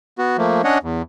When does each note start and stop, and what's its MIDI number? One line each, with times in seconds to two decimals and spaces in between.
0.19 0.37 59
0.19 0.37 66
0.38 0.62 53
0.38 0.62 57
0.38 0.62 58
0.64 0.78 61
0.64 0.78 62
0.64 0.78 73
0.64 0.78 75
0.64 0.78 78
0.83 1.02 40